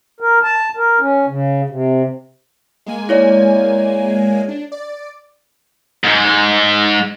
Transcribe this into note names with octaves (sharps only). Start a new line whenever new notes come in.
A#4
A5
A#4
C#4
C#3
C3
G#3 A#3 G#5
E4 C#5 D5
D4
D5
G#2 G#3